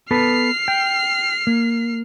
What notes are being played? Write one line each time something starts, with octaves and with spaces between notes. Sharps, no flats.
B3 A4 B4 F6 C7
G5
A#3